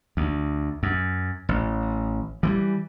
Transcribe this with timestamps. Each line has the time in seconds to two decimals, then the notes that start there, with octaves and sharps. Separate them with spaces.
0.17 D2
0.83 F#2
1.49 A1
2.43 E3 F#3 G3